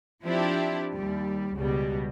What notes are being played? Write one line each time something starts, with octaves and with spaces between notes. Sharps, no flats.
F3 C4 D4 E4 G4
D#2 G3
C#2 B2 G3